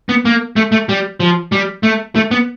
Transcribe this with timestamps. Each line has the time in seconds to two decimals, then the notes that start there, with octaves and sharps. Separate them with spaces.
0.09 B3
0.25 A#3
0.56 A3
0.72 A3
0.89 G3
1.20 F3
1.52 G3
1.83 A3
2.15 A3
2.31 B3